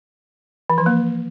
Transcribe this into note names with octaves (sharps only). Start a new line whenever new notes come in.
E3
F3
A#3